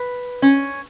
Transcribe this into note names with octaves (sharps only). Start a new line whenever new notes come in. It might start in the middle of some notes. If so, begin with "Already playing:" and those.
Already playing: B4
C#4